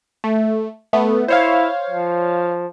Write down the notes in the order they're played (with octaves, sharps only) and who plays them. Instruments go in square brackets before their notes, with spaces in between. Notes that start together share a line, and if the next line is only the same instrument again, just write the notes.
[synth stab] A3
A3 B3
[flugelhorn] E4 [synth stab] C5 C#5 F5
[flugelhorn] F3